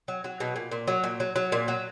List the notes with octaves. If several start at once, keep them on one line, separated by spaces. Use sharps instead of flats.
F#3
F#3
B2
A#2
A#2
F#3
A#2
F#3
F#3
A#2
F#3